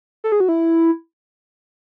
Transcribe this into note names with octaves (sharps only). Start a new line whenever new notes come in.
A4
G#4
F#4
E4